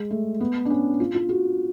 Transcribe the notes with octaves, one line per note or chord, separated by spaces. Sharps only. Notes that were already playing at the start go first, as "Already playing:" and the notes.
Already playing: G#3
A3
B3
D4
C#4
F4
F4
F#4